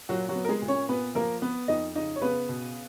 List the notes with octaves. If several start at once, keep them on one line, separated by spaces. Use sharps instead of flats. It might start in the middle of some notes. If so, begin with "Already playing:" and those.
A#2 F#3 F#4
F#3 F#4
B3
A#4
G#3 G#4
A#2
C#4 C#5
A#2 B3 B4
F3 A#3 A#4
B3 B4
F2 D#4 D#5
C#3 D#4 D#5
C#5
C#3 B3 B4
B2